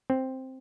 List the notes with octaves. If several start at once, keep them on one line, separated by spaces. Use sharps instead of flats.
C4